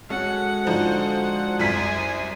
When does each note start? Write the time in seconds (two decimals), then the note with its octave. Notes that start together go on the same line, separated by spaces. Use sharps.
0.10 G#3 C#4 F#4 A4 F#5
0.67 D3 F3 D#4 C5
1.59 C2 F#2 G#5 B6